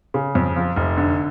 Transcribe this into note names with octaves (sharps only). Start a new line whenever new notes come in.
C#3
F2
F3
F1
D3